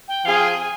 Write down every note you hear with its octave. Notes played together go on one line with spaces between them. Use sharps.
G5
F3 C4 F4 G#4 F5
G5
G#5
G#5